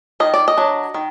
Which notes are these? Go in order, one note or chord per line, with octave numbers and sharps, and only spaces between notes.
D#3 D#5
D5
D#5
F#3 D4
D#3